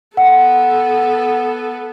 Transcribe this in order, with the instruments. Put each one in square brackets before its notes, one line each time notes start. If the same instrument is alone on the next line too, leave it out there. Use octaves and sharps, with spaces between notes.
[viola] B3 A4 [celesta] F#5